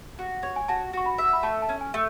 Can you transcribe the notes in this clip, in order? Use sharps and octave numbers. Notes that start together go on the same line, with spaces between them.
F#4
C#5
G#5
F#4 A5
F#4 C#6
B5
E5
B5
A3 A5
A5
C#4
G#5
A3